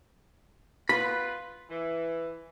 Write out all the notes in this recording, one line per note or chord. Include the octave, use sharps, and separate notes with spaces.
B3 F4 B4 B5
E3